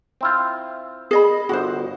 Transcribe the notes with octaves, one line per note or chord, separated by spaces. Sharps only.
C4 E4 F4
G#4 D#5 B5
G1 F#4 C5 F#5